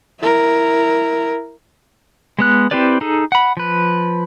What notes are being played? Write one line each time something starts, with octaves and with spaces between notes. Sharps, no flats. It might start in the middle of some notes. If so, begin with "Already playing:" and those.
E4 A#4
G#3 B3 F#6
C4 E4 G4 B4 D5
D#4 G#4 A4
F#5 B5
F3 B4